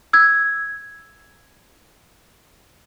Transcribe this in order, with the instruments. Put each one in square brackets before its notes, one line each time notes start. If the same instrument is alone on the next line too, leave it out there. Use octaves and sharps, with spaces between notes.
[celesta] E6 G#6